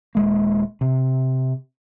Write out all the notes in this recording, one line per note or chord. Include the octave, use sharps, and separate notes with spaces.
D#1 G#3 A#3
C3